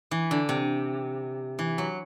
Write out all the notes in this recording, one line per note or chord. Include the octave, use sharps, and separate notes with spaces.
E3
D3
C3
E3
F#3